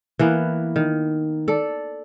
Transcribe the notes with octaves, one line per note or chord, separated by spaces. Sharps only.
E3 A#3 B3
D#3
A4 D5